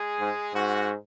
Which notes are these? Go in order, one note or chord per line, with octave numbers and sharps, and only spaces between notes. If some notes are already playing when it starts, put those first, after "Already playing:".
Already playing: G#3 G#4
G#2
G#2 F#4